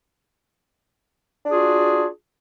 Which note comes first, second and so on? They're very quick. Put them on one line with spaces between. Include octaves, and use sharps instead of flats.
D4 G#4 F4 F#4